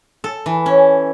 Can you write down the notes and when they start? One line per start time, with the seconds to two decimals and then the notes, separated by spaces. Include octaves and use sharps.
0.24 A4
0.46 E3
0.66 C#4